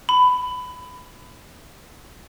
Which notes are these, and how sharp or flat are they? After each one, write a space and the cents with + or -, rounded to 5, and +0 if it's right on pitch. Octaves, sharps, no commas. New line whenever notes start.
B5 +15